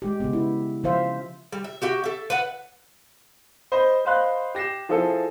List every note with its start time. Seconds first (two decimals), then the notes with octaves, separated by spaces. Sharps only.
0.02 G#3 G4
0.20 C#3 B3
0.33 E4
0.83 C#3 F3 F4 C5 E5 F5
1.52 G3
1.64 E5
1.82 F#4 G4 E5
2.04 A4 E5
2.30 B4 E5 F#5
3.72 C5 D#5 B5
4.05 C5 D#5 F5 B5 C6 F#6
4.55 G4 A#6 C7 E7
4.89 F3 E4 G#4 A4